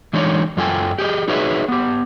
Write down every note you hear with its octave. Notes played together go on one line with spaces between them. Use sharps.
E3 F#3 G#3 D4 D#4 C#5
F#2 F#3 F4 A4 G5 G#5
G4 G#4 C#5 D#5
D#4 F#4 G#4 B4 C#5 E5
B3 G4